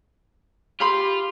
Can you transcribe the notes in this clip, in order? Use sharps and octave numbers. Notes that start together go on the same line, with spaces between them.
F4 G4 B5 C6